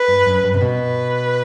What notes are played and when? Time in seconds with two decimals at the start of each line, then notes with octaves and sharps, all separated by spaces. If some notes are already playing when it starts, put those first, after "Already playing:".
Already playing: B4
0.08 G2
0.26 F#2
0.44 G2
0.54 C3
0.61 B2 B4